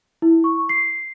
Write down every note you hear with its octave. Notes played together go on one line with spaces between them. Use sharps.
E4
C#6
C7